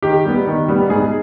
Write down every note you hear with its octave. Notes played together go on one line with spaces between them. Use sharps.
D#3 G4
G3 B3
D#3
G3 B3
G#2 G#4